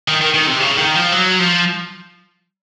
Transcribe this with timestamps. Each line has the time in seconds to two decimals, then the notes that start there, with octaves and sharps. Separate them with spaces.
0.08 D#3
0.21 D#3
0.34 D#3
0.47 C3
0.60 C#3
0.78 D#3
0.95 F3
1.12 F#3
1.39 F3